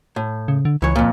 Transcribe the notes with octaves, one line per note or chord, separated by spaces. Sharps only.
A2
C#3
D3
C#2 E3 C#5
F2 A#2